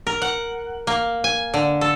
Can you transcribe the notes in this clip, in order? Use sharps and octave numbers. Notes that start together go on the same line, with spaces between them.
A#4
F#5
A#3
G#5
D3
A4